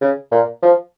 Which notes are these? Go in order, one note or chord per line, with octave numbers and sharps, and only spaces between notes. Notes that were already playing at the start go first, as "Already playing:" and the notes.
C#3
A#2
F3